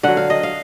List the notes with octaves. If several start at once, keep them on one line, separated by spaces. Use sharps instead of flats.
D3 F#3 F#5
F5
D#5
F5